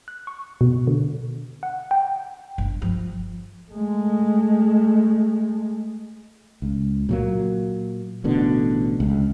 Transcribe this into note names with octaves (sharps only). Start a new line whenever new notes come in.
F#6
C#6
B2
D3
F#5
G5
G1
F3
G#3 A3
C#2
A#2 F#3 A#3
A1 B2 D3
C#2